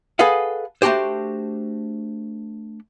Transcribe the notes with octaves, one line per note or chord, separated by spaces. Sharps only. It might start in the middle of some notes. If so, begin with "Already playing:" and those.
G#4 A4 B4 D#5 F5 F#5
A3 D4 F#4 G4 C5